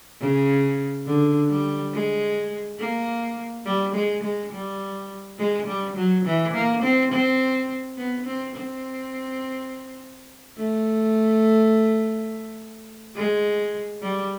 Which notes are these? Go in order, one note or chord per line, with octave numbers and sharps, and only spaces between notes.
C#3
D3
G3
G#3
A#3
G3
G#3
G#3
G3
G#3
G3
F#3
E3
A#3
C4
C4
B3
C4
C4
A3
G#3
G3